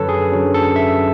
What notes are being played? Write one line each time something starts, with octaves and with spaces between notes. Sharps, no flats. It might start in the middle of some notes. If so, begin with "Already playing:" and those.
Already playing: F#2 D3 F#3 C#4 A4 B4 C#5
G#4
F#2 D3 F#3 C#4
A4
E5